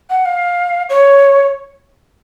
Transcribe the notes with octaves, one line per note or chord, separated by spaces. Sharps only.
F#5
F5
C#5